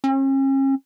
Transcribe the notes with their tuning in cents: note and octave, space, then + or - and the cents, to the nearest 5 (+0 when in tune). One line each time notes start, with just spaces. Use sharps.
C#4 -40